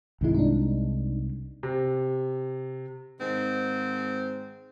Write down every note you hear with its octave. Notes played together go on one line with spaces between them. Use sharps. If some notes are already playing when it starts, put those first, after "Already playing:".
C2 G#2 D#3 G#3 E4
D4 D#4
C3
G#2 D#3 C4